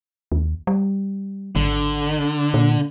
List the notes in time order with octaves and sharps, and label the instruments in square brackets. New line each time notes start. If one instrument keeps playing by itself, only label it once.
[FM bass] D#2
G3
[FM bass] G#1 [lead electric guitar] D3
[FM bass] A#2